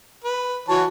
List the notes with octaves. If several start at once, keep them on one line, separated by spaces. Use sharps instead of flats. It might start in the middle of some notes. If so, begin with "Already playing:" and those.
B4
E3 F#4 C#5 A5